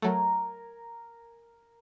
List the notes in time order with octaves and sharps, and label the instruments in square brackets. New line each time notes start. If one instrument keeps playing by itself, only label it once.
[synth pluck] F#3 A3 [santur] A#4 G#5